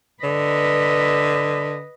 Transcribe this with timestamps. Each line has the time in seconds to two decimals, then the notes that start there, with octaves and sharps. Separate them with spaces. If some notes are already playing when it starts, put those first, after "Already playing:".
0.23 D3 B4 D#5